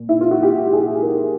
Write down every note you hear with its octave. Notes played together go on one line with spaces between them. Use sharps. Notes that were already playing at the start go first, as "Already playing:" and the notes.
Already playing: A#2
E4
F4
F#4
G4
G#4
A#4